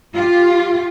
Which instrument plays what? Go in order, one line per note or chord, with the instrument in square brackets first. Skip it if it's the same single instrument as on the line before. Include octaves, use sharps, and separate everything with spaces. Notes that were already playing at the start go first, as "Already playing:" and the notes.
[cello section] F4 G4